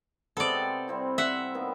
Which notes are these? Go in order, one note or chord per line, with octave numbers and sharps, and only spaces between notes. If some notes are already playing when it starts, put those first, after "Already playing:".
C3 G#3 B3 A4 D5
G5
G3 C4 E4
E5 F#5
D#3 A#3 B3